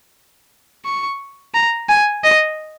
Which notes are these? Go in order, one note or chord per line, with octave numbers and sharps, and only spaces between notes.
C#6
A#5
G#5
D#5